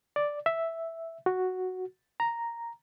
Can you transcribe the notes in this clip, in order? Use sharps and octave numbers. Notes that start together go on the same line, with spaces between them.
D5
E5
F#4
A#5